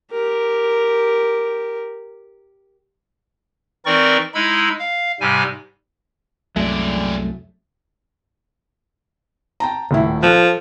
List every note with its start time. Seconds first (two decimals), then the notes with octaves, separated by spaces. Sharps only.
0.11 G4 A#4
3.86 E3 C4 D#4 A#4 D5 C#6
4.34 G#3 D#4 E4 B5 E6
4.79 F5
5.21 G#2 C3 G3 G#5
6.56 C2 F#2 F#3 G#3 A3 D5
9.60 G5 A5 A#5
9.91 D#1 A2 E4
10.23 F3 A4 F#6